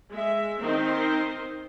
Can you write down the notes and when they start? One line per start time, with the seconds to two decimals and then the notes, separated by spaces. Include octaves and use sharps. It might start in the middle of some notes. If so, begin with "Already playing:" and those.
0.12 G#3 E5
0.60 D#3 C4 D#4 A#4 C5 D#5